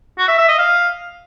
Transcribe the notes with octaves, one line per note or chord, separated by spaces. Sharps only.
F#4
E5
E5
D#5
F5